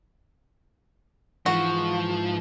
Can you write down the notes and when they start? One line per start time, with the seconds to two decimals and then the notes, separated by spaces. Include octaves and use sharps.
1.46 G#2 E3 F3 F#4 E7